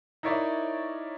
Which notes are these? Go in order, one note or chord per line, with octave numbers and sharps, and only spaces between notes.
D#4 E4 A#4 C#5 D5 E5